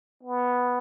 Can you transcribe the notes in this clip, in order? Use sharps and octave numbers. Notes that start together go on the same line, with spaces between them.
B3